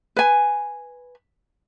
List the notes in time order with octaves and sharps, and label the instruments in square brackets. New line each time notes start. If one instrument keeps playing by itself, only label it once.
[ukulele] B4 G#5